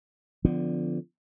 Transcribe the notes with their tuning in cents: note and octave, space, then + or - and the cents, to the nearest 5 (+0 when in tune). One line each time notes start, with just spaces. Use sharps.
D3 +0 F3 +0 B3 +35